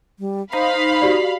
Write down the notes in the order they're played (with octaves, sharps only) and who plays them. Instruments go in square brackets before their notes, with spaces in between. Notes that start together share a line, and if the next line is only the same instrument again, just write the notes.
[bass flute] G3
[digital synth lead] D#4 [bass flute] C5 [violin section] F5 B5
[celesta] F#4 G4 D5